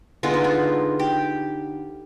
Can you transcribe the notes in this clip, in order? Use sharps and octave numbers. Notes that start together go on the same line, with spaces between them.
D3 G#3 B3 F4
D#4
F4
G4